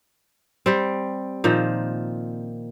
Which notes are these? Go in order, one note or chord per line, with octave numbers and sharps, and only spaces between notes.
G3 C4
A#2 D#3 F3